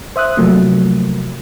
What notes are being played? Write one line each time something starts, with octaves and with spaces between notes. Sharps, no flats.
C5 E5 D#6 F#6
C3 F3 F#3 A3 A#3